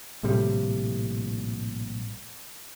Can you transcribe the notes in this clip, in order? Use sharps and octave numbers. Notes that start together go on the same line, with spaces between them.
A#1 A2 C3 G3